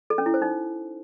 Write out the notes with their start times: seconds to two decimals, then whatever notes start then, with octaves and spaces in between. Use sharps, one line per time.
0.10 A4
0.18 C#4
0.26 E4
0.34 C5
0.42 D#4